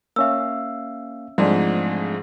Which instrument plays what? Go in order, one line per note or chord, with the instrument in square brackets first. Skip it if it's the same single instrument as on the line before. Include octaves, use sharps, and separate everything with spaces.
[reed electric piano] A#3 C#4 F5 [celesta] E5 E6
[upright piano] G#2 [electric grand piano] F3 A3 G#4 [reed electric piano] F#3 C4 D4